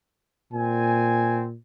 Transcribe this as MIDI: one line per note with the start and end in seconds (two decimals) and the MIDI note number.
0.53 1.56 46
0.53 1.43 60
0.53 1.43 80